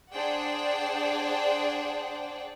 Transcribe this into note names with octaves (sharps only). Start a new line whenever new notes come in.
D4 G#4 C5 D5 F#5 G5